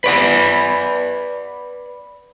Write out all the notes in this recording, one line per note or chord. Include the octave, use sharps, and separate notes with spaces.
B4 D5 F#5